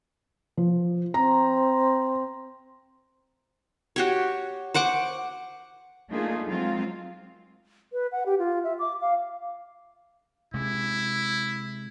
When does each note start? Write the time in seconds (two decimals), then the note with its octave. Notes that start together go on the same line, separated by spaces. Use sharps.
0.57 F3
1.14 C4 A#5
3.96 F#4 G4 C#5
4.74 C5 F#5 C#6 D6
6.10 A3 A#3 D4 D#4 F4 G#4
6.45 F#3 G#3 C4 F4
7.93 B4
8.12 F#5
8.26 G4
8.39 F4
8.64 E5
8.79 D6
9.01 F5
10.54 C3 G#3 E4